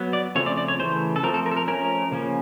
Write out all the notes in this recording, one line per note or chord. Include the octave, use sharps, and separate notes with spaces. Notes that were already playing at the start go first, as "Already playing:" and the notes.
Already playing: F#3 B3
D5
C#3 F3 A3 C4 C#5
D5
D5
C#5
C#3 E3 A3 C5
A4
F3 A3 C4 A#4
A4
A#4
A4
A#4
F3 A3 C#4 A#4
C#3 F3 A#3 C#4